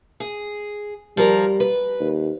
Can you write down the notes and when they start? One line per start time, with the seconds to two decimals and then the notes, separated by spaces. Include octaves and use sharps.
0.20 G#4
1.17 F3 G3 A#4
1.60 B4
2.00 D#2